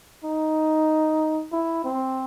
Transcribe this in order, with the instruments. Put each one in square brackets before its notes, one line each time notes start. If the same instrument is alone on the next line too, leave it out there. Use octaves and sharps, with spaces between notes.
[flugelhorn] D#4
E4
C4